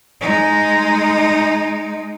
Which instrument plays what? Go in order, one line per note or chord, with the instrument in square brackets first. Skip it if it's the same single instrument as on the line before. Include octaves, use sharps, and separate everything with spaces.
[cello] G#3 D#4